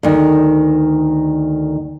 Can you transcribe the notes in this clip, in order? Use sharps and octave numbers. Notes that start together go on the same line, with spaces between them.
D2 D#3